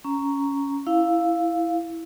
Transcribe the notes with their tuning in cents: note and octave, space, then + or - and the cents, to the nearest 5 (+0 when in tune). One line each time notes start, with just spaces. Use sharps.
C#4 +5 A#5 -5
E4 +0 F5 +0